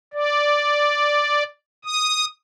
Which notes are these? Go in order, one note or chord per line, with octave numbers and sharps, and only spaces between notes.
D5
D#6